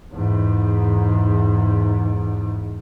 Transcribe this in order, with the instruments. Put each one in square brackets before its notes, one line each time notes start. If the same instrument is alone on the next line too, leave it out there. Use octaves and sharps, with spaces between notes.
[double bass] E2 G#2